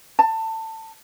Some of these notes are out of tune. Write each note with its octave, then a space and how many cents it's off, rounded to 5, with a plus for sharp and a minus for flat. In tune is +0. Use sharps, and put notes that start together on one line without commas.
A5 +20